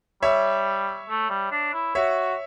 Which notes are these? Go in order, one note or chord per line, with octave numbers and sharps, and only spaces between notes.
G3 C#5 E5
A3
G3
D4
E4
F#4 C#5 E5